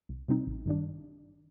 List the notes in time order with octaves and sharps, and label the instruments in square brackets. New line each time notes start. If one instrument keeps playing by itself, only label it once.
[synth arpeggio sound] C2
C3 G3 C4 D#4
A1
G2 D#3 G3 D4